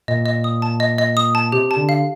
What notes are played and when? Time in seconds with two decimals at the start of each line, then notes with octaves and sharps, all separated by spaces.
0.08 A#2 D#5
0.26 D#5
0.44 D#6
0.62 A5
0.80 D#5
0.98 D#5
1.17 D#6
1.35 A5
1.52 C3 G4
1.71 A5
1.76 D3
1.89 F5